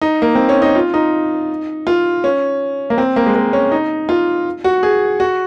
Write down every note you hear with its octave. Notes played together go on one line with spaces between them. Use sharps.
D#4
A#3
C4
C#4
D#4
F4
D#4
F4
C#4
A#3
C4
A#3
G#3
A#3
C#4
D#4
F4
F#4
G#4
F#4